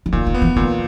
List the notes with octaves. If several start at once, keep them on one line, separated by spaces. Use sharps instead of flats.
E3
A#2 D#3
D#3
B3
E3
A#2 D#3